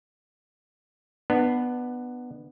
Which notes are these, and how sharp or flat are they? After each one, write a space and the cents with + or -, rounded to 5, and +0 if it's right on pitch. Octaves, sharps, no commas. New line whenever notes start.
B3 +0 D4 +30